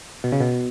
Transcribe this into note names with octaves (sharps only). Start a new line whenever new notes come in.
B2
C#3
B2